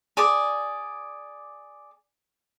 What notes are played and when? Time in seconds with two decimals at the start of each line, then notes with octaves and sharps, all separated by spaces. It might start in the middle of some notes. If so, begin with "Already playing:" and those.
0.17 G#4 D5 D6